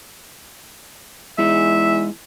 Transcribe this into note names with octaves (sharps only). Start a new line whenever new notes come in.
E2 G#3 D#4 G#4 E5